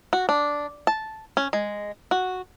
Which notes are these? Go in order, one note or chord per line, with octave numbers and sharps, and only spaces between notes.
F#4
D4
A5
C#4
G#3
F#4